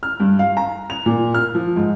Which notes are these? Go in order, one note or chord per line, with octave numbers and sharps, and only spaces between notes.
F6
G2
F5
A#5
F7
A#2
F6
F3
G#2